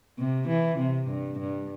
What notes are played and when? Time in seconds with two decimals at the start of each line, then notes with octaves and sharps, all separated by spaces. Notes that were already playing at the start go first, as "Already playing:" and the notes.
0.19 C3
0.48 E3
0.79 C3
1.08 G2
1.39 G2